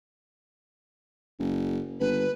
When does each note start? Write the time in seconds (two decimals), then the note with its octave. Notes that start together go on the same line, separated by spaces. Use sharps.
1.39 F#1
2.00 G1 B4